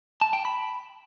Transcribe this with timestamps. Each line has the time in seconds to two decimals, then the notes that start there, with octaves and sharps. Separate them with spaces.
0.21 A5
0.33 G5
0.45 B5